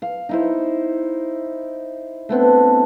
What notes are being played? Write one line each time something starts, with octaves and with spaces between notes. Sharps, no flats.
F5
D#4 E4 C5
A3 B3 C4 D4